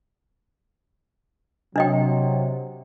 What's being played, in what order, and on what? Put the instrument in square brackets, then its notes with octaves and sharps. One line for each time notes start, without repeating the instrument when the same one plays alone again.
[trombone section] C3 F#3 [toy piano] D4 D#5 G5